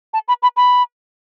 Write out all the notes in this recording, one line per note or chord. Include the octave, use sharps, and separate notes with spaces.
A5
B5
B5
B5